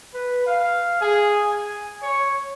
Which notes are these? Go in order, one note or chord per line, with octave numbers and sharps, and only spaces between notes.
B4
F5
G#4
G#5
C#5